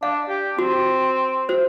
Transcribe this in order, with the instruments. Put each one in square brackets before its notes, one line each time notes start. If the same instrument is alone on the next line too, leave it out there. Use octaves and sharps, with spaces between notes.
[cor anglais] D4 [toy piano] F5
[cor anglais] G4
[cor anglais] C4 [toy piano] F#4
[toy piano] F#4 C5